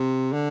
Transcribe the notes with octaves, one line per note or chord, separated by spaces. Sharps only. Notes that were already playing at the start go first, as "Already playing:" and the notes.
Already playing: C3
D3